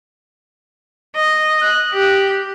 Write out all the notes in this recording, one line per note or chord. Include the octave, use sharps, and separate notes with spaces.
D#5
F#6
G4